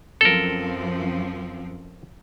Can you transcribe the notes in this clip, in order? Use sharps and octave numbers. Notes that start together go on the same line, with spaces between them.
F#2 F3 C4 A4 A#4